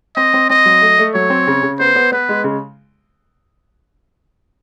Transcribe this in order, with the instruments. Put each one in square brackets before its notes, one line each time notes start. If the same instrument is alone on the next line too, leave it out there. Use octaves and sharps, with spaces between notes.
[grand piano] C4 [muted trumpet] D#5
[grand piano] C4
[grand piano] C4 [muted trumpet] D#5
[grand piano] F#3
A3
A3
[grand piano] F#3 [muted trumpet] C#5
[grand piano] C4
C#3
C#3
[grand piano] B3 [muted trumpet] C5
[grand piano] B3
[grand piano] B3 [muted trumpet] B4
[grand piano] G#3
C#3